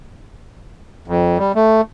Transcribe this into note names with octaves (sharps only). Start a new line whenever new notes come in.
F2
G3
A3